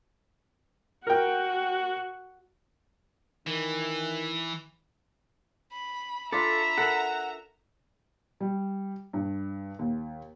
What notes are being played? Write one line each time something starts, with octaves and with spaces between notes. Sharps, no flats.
F#4 A#4 G5
D#3 E3
B5
D4 F4 A4 E5 A#5 B5
A4 A#4 F#5
G3
G2
D#2